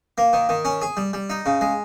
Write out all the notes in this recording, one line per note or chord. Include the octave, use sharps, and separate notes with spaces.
A#3
D#3
D#3
C#4
G#4
G3
G3
D#4
C#3
G#3